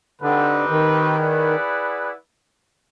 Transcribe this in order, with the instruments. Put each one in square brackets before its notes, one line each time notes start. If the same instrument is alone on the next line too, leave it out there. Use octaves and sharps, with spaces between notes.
[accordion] D3 [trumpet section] C4 D#4 G4 B4
[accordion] D#3
[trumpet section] E4 G#4 B4 D5 F#5